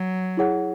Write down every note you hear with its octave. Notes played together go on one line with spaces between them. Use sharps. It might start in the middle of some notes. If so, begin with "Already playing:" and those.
Already playing: F#3
E4 G#4 C#5 F#5